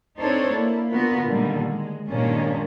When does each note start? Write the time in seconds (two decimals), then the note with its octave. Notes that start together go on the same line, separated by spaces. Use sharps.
0.18 C4 D4 D#4 A4 C5 C#5
0.51 A#3 E4
0.91 D3 B3 F4 F#4 A#4 B4
1.26 A#2 D3 D#3 G3 G#3
1.65 G#3
2.08 G2 A#2 D#3 G#3 C#4 D4